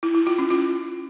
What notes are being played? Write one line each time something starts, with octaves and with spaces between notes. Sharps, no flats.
E4
E4
F4
C#4
F4